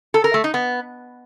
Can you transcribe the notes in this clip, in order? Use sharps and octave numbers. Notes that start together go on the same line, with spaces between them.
A4
A#4
A3
D#4
B3